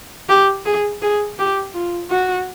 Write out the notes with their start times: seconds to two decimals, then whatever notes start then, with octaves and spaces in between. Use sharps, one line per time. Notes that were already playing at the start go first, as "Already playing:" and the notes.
0.29 G4
0.66 G#4
1.02 G#4
1.38 G4
1.74 F4
2.10 F#4